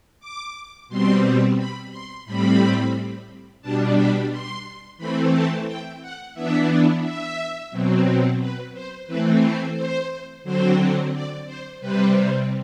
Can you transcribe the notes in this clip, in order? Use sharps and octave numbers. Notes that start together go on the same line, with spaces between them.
D6
B2 G3 C4 C6
B5
C6
A2 G3 C4 B5
B2 G3 D4 A5
B5
C6
E3 A3 C4 B5
A5
G5
F#5
E3 B3 D4 E5
E5
B2 F#3 C4
B4
C5
E3 A3 C4 B4
C5
C5
D3 F#3 C4 C5
D5
C5
C3 G3 C4 B4